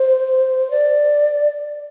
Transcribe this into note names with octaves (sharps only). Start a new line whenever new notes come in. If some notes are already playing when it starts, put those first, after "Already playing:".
Already playing: C5
D5